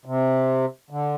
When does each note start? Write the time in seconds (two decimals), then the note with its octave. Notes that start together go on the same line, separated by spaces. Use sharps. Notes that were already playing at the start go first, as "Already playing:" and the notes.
0.05 C3
0.90 D3